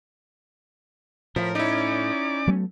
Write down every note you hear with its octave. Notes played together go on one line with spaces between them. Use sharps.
A2 F3 A#4 B5
C#4 D#4 E4 D5 D6
F#3 A3 B3